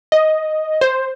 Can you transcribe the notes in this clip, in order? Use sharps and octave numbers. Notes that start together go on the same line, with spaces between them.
D#5
C5